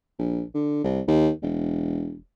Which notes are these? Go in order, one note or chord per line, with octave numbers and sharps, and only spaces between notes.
A#1
D3
C2
D#2
E1